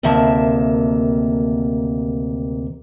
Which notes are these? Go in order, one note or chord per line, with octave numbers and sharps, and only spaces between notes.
D2 C3 D#3 A#3 E5 A5